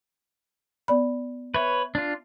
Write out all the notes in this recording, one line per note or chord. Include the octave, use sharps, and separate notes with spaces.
B3 D5 B5
B4 C#5 E5
D4 F4